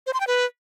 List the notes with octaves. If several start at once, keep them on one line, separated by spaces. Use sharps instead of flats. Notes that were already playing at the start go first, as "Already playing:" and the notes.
C5
C6
G5
B4